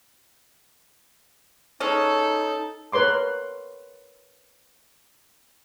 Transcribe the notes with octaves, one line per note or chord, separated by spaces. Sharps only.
G#3 C#4 D#4 A4
A#4 B4 C#5 C6 D6